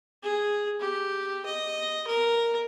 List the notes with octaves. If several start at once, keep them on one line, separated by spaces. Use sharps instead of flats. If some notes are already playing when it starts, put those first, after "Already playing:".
G#4
G4
D#5
A#4